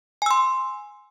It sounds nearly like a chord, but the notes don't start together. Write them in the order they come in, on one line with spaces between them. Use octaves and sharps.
G#5 E6 C6